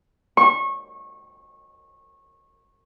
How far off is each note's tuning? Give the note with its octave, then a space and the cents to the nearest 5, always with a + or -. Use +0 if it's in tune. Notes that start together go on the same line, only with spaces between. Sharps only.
C#6 -25